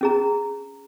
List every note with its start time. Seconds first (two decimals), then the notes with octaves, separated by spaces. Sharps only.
0.01 C#4 G#4 A#5